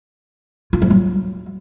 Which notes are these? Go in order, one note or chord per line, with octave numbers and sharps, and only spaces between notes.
F4
F3
F#3